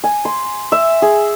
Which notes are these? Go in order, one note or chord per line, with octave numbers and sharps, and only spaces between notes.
G#5
C6
E5
G#4